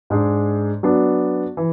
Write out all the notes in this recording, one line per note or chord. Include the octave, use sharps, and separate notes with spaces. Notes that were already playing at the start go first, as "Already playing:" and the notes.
G#2 G#3 D4
F#3 B3 D4
E3